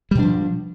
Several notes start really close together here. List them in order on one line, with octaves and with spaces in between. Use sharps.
G3 B2 D4 F3